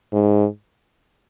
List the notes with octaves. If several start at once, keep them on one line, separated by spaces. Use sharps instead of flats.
G#2